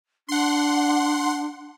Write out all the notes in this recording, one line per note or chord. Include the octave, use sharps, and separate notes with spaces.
D4 F#5 C6